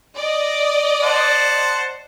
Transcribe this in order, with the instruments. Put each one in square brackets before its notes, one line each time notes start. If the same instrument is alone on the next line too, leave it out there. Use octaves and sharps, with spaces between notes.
[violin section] D5 D#5
[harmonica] C5 F#5 A5